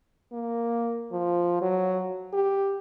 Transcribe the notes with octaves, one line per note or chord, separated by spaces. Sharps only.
A#3
F3
F#3
G4